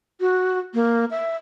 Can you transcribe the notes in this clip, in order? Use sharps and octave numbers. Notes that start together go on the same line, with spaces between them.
F#4
A#3
E5